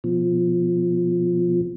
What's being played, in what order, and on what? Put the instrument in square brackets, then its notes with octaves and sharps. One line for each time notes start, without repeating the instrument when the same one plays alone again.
[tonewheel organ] B2 F3